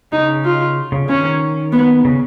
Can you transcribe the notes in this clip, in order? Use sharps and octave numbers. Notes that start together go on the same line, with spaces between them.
C#3 D#4
F4
C#3
D#3 C#4
B3
C#3